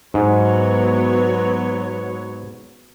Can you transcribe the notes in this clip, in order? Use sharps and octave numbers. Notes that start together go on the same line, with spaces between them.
G#2 F#3 B3 C#5